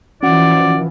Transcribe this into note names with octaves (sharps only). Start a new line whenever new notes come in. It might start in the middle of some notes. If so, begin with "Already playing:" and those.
E3 F3 C#4 F#4 D5 F#5